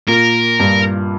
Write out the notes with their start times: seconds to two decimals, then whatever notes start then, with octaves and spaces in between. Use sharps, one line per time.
0.08 A#2 A#3 A#4
0.60 G2 G3